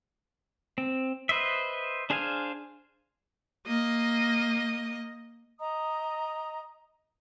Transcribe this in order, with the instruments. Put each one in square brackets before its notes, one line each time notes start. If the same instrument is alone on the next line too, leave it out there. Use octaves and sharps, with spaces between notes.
[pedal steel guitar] C4
B4 C5 D#5 E5
D4 G#4 C5 F5 G#5
[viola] A#3 D#5
[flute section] D#5 A#5 D#6